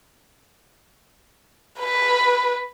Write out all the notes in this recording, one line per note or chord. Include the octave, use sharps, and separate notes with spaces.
B4